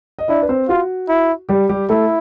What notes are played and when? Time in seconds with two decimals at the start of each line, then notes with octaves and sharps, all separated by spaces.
0.19 D#5
0.28 D4 E4 D5
0.42 B4
0.49 C4 C5
0.69 F4 F#4
1.09 E4
1.49 G3 G4
1.69 G3 G4
1.89 A3 E4 A4